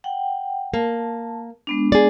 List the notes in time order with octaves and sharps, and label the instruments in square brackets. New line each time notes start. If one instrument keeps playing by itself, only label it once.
[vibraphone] F#5 G5
[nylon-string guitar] A#3 [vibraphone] A5
[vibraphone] G#3 B3 D4
[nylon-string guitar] G#4 D5